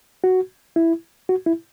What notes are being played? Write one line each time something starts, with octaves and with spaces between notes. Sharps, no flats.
F#4
E4
F#4
E4